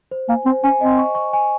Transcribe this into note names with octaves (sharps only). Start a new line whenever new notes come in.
C5
A#3 G#5
C4 C5
C#4 G#5
C4 D#5
C#6
C#6
G#5